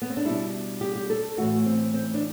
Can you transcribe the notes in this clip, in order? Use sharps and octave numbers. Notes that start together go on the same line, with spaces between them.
B3
C4
D4
B2 G3 E4
G4
G4
A4
A2 E3 A3 F#4
C4
C4
D4